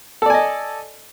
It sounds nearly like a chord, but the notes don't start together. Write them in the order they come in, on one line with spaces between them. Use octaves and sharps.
A4 D5 G#5 D#5